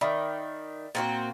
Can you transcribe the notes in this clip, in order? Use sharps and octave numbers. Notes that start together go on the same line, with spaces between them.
D#3 D5 E5 B5
A#2 C4 F#4